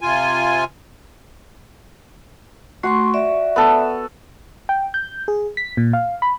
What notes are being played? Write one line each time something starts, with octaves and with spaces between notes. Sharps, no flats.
C3 F4 G#5
A3 F#4 C6 C#6
D5 E5
B3 A4
G5
G6
G#4
B6
A#2
F5
B5